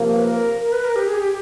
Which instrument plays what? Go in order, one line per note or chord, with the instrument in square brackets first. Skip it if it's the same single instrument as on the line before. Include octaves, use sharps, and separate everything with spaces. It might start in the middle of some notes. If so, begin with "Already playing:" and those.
Already playing: [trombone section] C3 F3 A#3
[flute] B4
A#4
A#4
B4
A#4
G4
G#4
G4